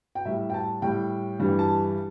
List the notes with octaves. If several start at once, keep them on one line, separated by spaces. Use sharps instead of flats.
G5
A2 G3 E5
G5
A5
A2 G3 G5
G2 E3 G3
A5